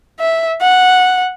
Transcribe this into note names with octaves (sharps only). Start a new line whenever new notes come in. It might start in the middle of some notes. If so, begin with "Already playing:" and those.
E5
F#5